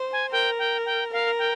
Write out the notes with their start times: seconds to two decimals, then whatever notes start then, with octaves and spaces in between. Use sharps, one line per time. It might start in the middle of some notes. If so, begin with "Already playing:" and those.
Already playing: C5
0.12 G#5
0.32 A#4 G5
0.59 G5
0.85 G5
1.12 A#4 F5
1.39 G5